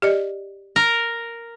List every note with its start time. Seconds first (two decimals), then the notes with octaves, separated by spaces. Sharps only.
0.02 G4 D5 D#5
0.76 A#4